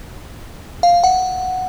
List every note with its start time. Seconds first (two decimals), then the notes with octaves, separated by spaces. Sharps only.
0.83 F5
1.04 F#5